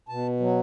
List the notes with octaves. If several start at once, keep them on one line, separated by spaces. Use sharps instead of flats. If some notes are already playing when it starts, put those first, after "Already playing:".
B2 A5
F#3